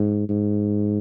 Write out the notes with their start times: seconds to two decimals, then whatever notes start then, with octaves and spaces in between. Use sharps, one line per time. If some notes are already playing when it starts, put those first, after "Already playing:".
Already playing: G#2
0.29 G#2